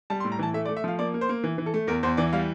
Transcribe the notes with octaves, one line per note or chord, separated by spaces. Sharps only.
G3 A5
C6
A2
A#5
E3 A5
A3 E5
D5
A3
E5
F3 F5
A#3 D5
A#3
C5
A#3
E3
E3
A4
A3
E2 A#4
E2 C5
E3 D5
G3 F5